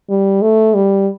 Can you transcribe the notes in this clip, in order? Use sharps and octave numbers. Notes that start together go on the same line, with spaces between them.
G3
A3
G3